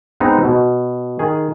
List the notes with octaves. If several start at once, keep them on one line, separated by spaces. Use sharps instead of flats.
G#3 B3 C4 D#4
B2
D#3 G#4